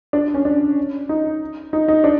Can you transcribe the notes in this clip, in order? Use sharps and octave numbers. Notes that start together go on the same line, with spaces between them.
D4
C#4
D4
D#4
D#4
D#4
D4